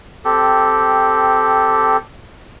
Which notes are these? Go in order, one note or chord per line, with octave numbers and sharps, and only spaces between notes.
C4 G4 A4